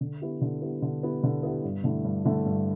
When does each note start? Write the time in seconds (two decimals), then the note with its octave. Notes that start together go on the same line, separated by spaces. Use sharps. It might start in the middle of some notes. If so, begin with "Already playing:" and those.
0.01 D3
0.22 B3 E4 G4
0.41 D3
0.62 B3 E4 G4
0.82 D3
1.03 B3 E4 G4
1.23 D3
1.43 B3 E4 G4
1.64 G2
1.84 D3 A3 E4
2.04 G2
2.25 D3 A3 E4
2.46 G2